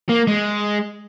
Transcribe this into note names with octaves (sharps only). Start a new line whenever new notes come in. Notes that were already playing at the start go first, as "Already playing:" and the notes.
A#3
G#3